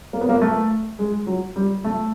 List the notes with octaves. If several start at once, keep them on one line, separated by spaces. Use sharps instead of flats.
A#3
B3
A#3
A3
G#3
F#3
G3
A3